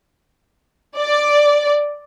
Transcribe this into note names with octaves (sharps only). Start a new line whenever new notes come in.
D5